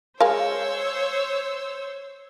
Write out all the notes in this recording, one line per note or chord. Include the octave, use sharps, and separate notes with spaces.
G#3 A#4 C5 C#5 F5 E6